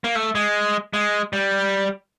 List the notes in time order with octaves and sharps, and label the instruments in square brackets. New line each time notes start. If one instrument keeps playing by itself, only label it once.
[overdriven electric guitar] A#3
A3
G#3
G#3
G3